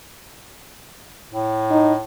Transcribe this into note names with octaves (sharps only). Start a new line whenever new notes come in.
A2
D#4